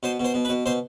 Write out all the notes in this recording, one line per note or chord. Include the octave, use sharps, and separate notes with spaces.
B2 C5
B2 C5
B2
B4
B2
B2 C5